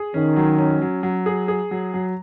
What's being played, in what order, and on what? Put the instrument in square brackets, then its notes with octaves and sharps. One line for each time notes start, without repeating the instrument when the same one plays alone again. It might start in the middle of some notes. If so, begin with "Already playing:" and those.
Already playing: [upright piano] G#4
[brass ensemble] D#3 [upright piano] C#4
[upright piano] F#3
C#4
F#3
F#3
G#4
G#4
F#3
F#3